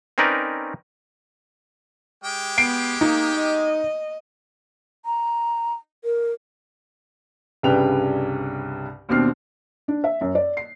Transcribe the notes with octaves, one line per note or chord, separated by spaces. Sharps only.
C4 C#4 D#4 A#4 B4 D5
G#3 G4 G5
B3 C7 D7
A#3 D#4
D#5
A#5
A#4
C2 G2 C#3 B4 G5 F7
D#2 B2 C4 D4 F6 C7
D4
E5
F#2
D5
C7